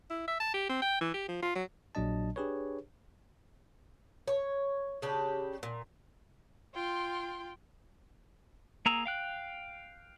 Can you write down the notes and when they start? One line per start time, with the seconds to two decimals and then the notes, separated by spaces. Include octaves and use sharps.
0.10 E4
0.28 E5
0.40 A5
0.54 G4
0.69 C4
0.82 G5
1.00 E3
1.14 G4
1.28 F3
1.42 F4
1.55 F#3
1.95 A#1 A#2 F#3 D4 D#5 A5
2.36 D4 G4 G#4 B4 C#5
4.28 C#5
5.02 C#3 D4 G4
5.63 A#2
6.74 F4 G5 C6
8.86 A#3 G#4 A#5 E6
9.06 F5 G5 F#6